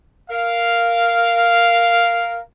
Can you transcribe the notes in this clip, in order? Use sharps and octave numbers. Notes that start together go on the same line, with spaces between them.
A#4 F5